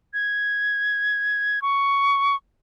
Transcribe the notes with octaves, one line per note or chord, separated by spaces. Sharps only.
G#6
C#6